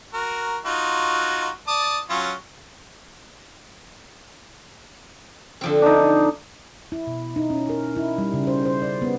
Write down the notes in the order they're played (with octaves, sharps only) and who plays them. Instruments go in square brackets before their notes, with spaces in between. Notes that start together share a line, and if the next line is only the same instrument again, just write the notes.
[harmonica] F#4 A#4
D#4 F4 F#4
D5 A5 D#6
F#3 C#4 F4
[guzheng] D3 F3 C4
[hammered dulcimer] D4 D#4
[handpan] E4
B2
D#4
C#4
A#4
E4
G3
C#3
C5
C5
D5
B3